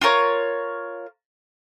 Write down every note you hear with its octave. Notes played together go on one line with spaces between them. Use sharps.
F4 A4 A#4 C#5